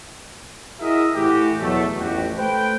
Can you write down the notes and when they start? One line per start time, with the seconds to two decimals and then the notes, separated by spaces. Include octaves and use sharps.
0.80 E4 F#4 G#4 A#4 D#5 E5
1.15 A2 E3 E4 F#4 G4
1.60 E2 B2 F#3 A3
1.96 A1 F2 A2 F#4 G4
2.37 A3 B4 C5 G5